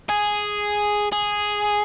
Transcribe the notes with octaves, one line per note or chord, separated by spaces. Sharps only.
G#4
G#4